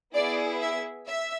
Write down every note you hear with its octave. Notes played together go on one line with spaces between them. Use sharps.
B3 E4 G#4 D5
E5
E5